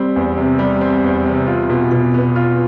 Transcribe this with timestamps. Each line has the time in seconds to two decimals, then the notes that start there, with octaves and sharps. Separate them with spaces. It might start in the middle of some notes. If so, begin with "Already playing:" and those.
Already playing: G3 C4
0.16 E2
0.37 C3
0.59 G3
0.81 C4
1.04 E2
1.26 C3
1.47 F4
1.70 B2
1.91 B2
2.14 B3
2.36 F4